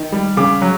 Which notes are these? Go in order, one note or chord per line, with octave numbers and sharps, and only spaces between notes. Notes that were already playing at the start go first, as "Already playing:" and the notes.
Already playing: D#3
G3
C#3 D6
F#3